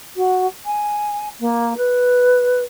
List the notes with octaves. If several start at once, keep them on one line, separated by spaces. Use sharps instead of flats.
F#4
G#5
A#3
B4